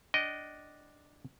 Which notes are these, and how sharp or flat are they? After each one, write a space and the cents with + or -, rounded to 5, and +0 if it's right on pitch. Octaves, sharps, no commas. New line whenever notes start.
D4 +0 D#5 +0 G5 -35